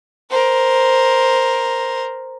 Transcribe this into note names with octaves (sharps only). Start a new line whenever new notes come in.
A#4 C5